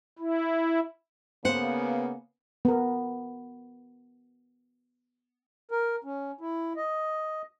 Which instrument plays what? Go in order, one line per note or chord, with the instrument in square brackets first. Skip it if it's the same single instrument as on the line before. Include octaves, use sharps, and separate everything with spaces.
[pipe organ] E4
[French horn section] C#3 A#3 B3 [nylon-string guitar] C5 F#5
[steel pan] B3 A#4
[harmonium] A#4
C#4
E4
D#5